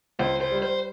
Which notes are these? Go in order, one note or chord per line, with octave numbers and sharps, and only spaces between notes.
C#2 C5
C5
G3
C5